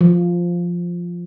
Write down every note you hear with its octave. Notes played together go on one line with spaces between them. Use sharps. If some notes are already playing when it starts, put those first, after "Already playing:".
F3